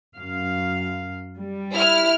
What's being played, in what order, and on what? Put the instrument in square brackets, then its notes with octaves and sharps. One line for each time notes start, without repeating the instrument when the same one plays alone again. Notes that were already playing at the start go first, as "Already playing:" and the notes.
[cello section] F#2 F5
G3
[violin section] E4 F6